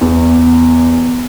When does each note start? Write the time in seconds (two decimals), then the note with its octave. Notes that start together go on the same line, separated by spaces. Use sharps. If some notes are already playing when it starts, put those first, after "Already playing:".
0.01 E2